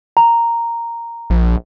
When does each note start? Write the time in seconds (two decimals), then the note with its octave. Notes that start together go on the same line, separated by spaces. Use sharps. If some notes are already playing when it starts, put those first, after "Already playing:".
0.17 A#5
1.30 A#1